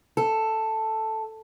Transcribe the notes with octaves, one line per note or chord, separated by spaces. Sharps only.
A4